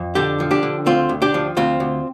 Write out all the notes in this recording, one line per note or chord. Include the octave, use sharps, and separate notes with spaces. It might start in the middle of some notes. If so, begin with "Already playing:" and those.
Already playing: F2
D3 D4 G4
F3
D4 G4
D3
D2 C4 F4
D2
D4 G4
F3
D2 C4 F4
D2